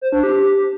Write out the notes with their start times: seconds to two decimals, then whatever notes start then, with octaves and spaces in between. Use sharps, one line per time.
0.01 C5
0.12 D4
0.23 G4